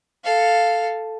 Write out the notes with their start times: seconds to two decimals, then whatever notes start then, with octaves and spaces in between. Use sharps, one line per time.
0.24 A4 F5